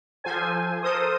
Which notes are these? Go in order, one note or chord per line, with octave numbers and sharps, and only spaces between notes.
F3 A4 C5 G#5
A4 A#4 C5 D#6